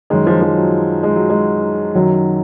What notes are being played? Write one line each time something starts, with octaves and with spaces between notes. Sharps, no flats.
F#2 D#3 G#3
F3
F3
F#3
G#3
F#3
G#3
F#2 D#3 F#3